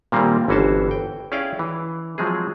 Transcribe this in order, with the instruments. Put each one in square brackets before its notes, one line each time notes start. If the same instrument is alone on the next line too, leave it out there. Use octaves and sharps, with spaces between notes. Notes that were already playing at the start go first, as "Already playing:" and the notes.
[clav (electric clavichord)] A#2 D#3 G3 A#3 C4
G1 E3 C#4 F#4 C5 A5
G5
C#4 E4 G#4 D5 F5 G5
E3
F3 F#3 G#3 C4 G#4